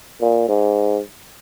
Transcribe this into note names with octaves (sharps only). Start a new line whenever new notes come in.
A#2
G#2